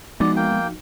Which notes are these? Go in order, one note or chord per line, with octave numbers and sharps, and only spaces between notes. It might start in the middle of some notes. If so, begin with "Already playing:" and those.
F3 G#3 B3 D#4 F#4 D5
A#3 G5